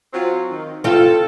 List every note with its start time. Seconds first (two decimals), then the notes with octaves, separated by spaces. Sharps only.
0.13 F#3 C4 F4
0.50 D#3
0.84 C4 F4 A4